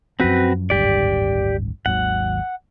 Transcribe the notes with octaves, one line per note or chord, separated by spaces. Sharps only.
F#2 F3 C4 F#4 B4
D1 G#1 G2 G4 D5
G#1 D#2 F#3 F#5